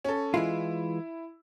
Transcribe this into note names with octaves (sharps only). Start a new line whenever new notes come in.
C#4 A4
E3 G#3 E4 F4